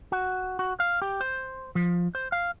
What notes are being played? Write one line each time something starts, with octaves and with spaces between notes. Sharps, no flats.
F#4
F#4
F5
G4
C5
F3
C5
F5